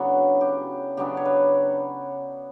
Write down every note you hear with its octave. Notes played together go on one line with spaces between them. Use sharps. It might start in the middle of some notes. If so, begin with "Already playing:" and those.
Already playing: C#3 F#3 B3 D4 E4 F#4
G4
C#3 F#3 B3 D4 G4
C#5
B4